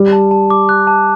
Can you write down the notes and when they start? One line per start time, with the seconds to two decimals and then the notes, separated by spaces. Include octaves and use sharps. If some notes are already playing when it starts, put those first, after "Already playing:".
Already playing: G3
0.12 A5
0.31 A5
0.50 D6
0.69 F#6
0.87 A5